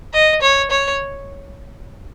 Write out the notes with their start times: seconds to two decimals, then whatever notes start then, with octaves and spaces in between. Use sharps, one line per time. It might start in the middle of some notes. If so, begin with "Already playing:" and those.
0.14 D#5
0.42 C#5
0.71 C#5